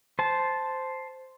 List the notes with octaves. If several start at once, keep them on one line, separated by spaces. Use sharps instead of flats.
C5 A5